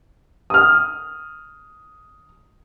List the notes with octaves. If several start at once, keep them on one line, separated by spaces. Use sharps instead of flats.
D#6 F6